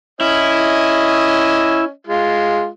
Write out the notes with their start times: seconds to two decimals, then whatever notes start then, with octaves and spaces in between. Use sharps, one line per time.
0.21 C#4 E4 D#5
2.07 G#3 F4